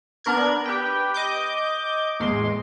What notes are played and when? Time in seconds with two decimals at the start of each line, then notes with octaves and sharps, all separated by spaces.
0.24 B3 D4 A#4 F#6 G#6
0.66 G4 B4 G5
1.14 D#5 D6 G6
2.20 A1 E2 G#3 C6